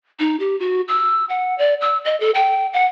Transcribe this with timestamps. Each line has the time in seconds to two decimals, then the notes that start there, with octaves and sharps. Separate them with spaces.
0.20 D#4
0.40 G4
0.60 F#4
0.88 E6
1.29 F#5
1.58 D5
1.81 E6
2.05 D#5
2.20 A4
2.35 G5
2.73 F#5